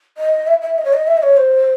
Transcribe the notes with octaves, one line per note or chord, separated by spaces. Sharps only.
D#5
E5
E5
D#5
C#5
D#5
E5
D#5
C#5
C5